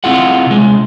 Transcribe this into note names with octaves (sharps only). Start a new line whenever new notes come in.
C4 E4 F4 G#4 F#5
C3 G#3